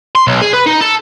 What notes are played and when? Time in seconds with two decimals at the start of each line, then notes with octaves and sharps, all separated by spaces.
0.15 C6
0.27 B1
0.41 G#4
0.53 B4
0.66 D#4
0.81 A4